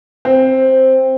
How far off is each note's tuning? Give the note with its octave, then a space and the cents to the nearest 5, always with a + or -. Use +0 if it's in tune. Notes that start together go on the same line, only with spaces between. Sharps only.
C4 +5